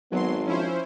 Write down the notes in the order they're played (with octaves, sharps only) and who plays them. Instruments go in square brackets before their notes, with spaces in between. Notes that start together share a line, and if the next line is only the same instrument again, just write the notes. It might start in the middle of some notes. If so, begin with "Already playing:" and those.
[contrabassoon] G#1 [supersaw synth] F#3 C6 [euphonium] B3
[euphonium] F3 [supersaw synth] C#4 E4 C5